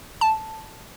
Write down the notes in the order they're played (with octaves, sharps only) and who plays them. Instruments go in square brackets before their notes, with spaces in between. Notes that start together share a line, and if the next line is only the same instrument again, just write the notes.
[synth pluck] A5